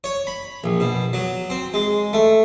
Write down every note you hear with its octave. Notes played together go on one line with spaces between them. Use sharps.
C#5
B5
A#1
B2
F#3
C4
G#3
A3